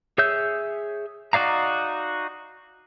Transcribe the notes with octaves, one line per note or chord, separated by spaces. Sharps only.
G#4 C#5 E5 E6 G6
D#4 F#4 D5 F5 A#5